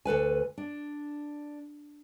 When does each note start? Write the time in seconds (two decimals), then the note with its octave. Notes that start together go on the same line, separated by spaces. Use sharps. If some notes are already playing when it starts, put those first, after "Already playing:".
0.05 D2 A4 B4 G#5
0.58 D4